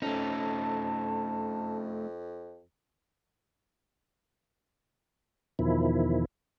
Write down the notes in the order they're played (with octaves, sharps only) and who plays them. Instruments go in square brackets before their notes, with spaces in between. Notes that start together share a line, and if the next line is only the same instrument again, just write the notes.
[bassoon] F2 [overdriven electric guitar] A3 D#4 [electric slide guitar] C#4 [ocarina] A5
[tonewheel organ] E2 B2 D#3 F3 E4